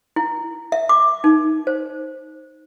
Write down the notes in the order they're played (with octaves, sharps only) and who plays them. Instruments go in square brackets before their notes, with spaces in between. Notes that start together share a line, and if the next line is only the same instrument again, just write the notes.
[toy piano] E4
E5
D6
D#4
C5